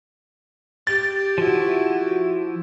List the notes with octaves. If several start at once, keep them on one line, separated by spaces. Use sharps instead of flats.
G4 A6
F3 E4 F#4